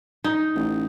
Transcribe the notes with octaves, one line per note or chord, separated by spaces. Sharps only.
D#4
A1